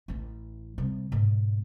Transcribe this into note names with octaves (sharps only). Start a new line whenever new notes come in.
A1 E3
C3 G3
G#2 B2